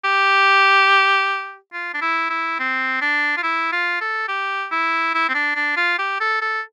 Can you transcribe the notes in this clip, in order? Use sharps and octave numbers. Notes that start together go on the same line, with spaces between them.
G4
F4
D4
E4
E4
C4
D4
F4
E4
F4
A4
G4
E4
E4
C4
D4
D4
F4
G4
A4
A4